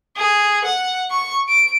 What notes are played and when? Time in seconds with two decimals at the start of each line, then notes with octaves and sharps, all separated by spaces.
0.17 G#4
0.65 F#5
1.11 C#6
1.48 D7